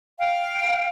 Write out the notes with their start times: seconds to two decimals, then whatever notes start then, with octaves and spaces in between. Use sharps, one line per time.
0.19 F5 G5